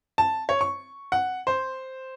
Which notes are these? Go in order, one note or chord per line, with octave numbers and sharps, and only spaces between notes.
A5
C#5
C#6
F#5
C5